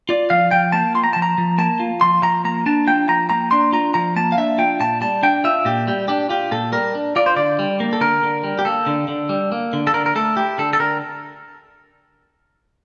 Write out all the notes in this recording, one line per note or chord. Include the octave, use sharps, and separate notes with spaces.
F4 D5
F3 F5
F3 G5
A#3 A5
F4 C6
A#5
F3 A5
A#5
F3
A#3 A5
F4
F3 C6
F3 A#5
A#3 A#5
D4 A5
F4 G5
F3 A#5
A#3 A#5
D4 C6
F4 A#5
F3 A#5
A#3 A5
F5
D4 E5
F4 G5
A#2 A5
G3 A5
D4 G5
F4 E5
A#2 G4
G3 G4
D4 G4
F4 G4
A#2 A4
G3 A#4
D4
F4 D5
C5
D3 D5
G3
A#3
A4
D3 A#4
D3
G3
G4
A#3 A4
D3
D3
G3
A#3
D3
A4
D3 A#4
A#4
A3 A4
E4 G4
D3 A4
A4
D3 A#4